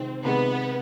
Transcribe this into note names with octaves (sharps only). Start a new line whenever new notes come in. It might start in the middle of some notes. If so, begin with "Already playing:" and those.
Already playing: C3 D#3 G#3 C4
C3 D#3 G#3 B3